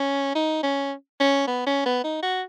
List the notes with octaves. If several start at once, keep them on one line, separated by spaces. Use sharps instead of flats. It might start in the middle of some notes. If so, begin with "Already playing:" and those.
Already playing: C#4
D#4
C#4
C#4
B3
C#4
B3
D#4
F#4